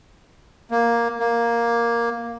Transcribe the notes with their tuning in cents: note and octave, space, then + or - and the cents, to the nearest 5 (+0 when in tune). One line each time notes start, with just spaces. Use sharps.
A#3 +5
A#3 +5